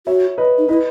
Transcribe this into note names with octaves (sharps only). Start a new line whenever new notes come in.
F#4 C#5 E5
B4 D#5
D#4
E4 B4 D#5